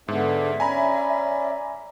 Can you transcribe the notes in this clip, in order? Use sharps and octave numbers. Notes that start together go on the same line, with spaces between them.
G#2 D3 B3 D4 E5
C#4 D5 G#5 A#5 B5